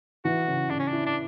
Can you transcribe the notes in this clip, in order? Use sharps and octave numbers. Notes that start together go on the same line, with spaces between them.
E3 F#4
C#3
C#3 D4
C#4
D4
E4
D4